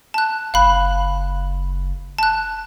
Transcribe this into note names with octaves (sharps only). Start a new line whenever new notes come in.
A5 F#6
F#1 F5 B5 F#6
A5 F#6